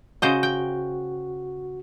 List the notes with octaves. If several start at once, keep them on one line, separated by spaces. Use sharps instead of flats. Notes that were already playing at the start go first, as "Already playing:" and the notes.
C#3 F#4 C5 D#5
G5